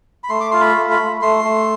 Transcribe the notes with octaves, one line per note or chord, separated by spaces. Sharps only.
B5
A3 C6
D6
F4 C6
B5
A3
B5
A3
A3 C6
A3